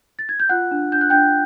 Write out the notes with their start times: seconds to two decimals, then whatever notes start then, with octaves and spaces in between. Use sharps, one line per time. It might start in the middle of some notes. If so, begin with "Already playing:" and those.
0.19 A6
0.29 G#6
0.40 G6
0.49 F4 F#5 F#6
0.71 D4
0.92 D4 G6
1.01 F#6
1.10 D4 G5 G6